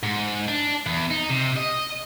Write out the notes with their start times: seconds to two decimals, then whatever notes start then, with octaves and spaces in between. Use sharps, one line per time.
0.03 G#2
0.48 D4
0.86 E2
1.11 D#4
1.30 C3
1.57 D#5